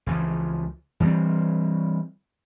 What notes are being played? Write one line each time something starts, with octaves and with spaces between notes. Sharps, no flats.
C#2 E3 F3
E3 G3 C4